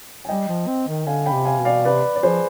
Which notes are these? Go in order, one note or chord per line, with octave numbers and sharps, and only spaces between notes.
G#5
G3 D#5 G5
F3
C4
D#3
D3 F5 G#5
G5 B5
C3
F5 G#5
B2
D5 F5
C3 B4 D5
D5
F3 G#4 C5